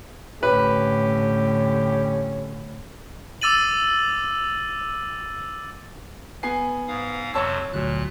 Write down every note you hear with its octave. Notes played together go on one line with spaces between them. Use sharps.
A2 D3 C#4 G4 B4
D6 E6 A6 D#7 F#7
B3 G#5 C7
G#2 F5 D#6
F2 C3 F#3 C#5 A5 E6
G1 D2 A#2 F#3 F#6